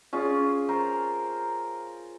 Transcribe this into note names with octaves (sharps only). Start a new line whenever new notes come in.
C#4 F4 G#4 D6
A#4 C5